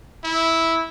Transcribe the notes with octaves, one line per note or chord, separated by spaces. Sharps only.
E4